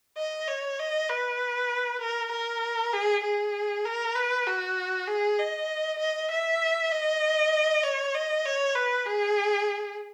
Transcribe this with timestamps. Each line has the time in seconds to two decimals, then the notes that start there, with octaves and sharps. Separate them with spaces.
0.17 D#5
0.48 C#5
0.79 D#5
1.10 B4
2.01 A#4
2.32 A#4
2.93 G#4
3.24 G#4
3.85 A#4
4.15 B4
4.46 F#4
5.08 G#4
5.38 D#5
5.99 D#5
6.31 E5
6.92 D#5
7.83 C#5
8.14 D#5
8.45 C#5
8.75 B4
9.07 G#4